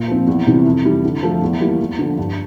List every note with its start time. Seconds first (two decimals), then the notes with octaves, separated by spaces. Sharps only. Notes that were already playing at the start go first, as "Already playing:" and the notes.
Already playing: A#2
0.08 F3 C4
0.27 E2
0.47 C3 E3 G3
0.65 F2
0.84 E3 G3
1.04 D3
1.23 F3 A3
1.42 E2
1.60 E3 G3 A#3
1.80 E2
1.99 D3 F3
2.18 G2